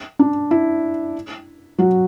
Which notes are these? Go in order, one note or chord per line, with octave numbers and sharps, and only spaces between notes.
D4
E4
F#3 F#4